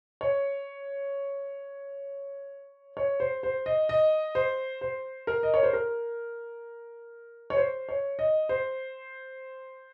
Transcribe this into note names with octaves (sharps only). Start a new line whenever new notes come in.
C#5
C#5
C5
C5
D#5
D#5
C5
C5
A#4
D#5
C#5
C5
A#4
C#5
C5
C#5
D#5
C5